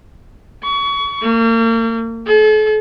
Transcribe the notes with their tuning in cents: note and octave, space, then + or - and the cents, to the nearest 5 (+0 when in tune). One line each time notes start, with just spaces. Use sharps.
C#6 +30
A#3 -40
A4 -40